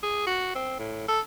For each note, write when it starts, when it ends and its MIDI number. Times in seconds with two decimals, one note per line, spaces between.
0.03 0.25 68
0.27 0.52 66
0.55 0.75 60
0.79 1.06 45
1.08 1.20 69